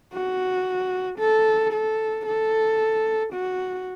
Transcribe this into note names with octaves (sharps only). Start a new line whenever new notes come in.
F#4
A4
A4
A4
F#4